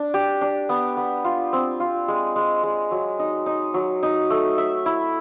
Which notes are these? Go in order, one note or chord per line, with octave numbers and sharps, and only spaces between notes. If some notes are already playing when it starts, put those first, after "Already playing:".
Already playing: D4
G4
D4
B3
B3
F4
C4
F4
G#3
G#3
G#3
F#3
D#4
D#4
F#3
D#4
A3
E5
E4